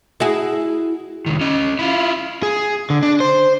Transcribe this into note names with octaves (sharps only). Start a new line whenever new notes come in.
E4 F#4 G#4
C2 D#3
C#4 D#5
E4 F4
G#4
D3
D4
C5